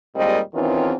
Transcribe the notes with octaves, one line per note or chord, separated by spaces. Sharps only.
D#2 A#2 G3 G#3 C4 D#5
E2 D#3 E3 C4 C#4 F4